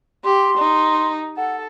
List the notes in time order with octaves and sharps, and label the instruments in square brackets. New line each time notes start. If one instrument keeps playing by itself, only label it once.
[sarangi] G4 [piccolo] C6
[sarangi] D#4
[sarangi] A4 [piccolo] F#5